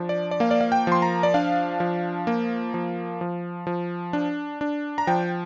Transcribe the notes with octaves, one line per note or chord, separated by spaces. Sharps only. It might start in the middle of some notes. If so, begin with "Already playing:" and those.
Already playing: F3 D4
D5
D5
A#3 F5
D5
F5
G5
F3 C6
A#5
D5
D4 F5
F3
A#3
F3
F3
F3
D4
D4
A#5
F3 G5